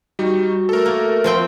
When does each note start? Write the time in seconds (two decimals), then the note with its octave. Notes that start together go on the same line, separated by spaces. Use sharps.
0.19 G3 D#4 F#4
0.69 A3 A4 A#4
0.86 A#3
1.24 F3 C4 F4 G5